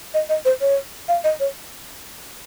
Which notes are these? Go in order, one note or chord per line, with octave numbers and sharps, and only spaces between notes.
D#5
D#5
C5
C#5
F5
D#5
C#5